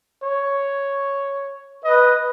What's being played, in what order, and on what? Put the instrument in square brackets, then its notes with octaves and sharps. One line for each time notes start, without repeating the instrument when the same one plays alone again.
[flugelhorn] C#5
[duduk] B4 [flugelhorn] D#5